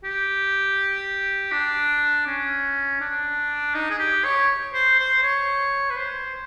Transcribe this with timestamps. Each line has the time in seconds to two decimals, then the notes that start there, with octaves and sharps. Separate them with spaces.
0.04 G4
1.52 D4
2.26 C#4
3.01 D4
3.74 D#4
3.90 G#4
3.99 G4
4.24 C#5
4.73 C5
4.99 C5
5.23 C#5
5.90 B4
5.97 C5